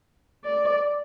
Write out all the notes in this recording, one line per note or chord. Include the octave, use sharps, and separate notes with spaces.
D5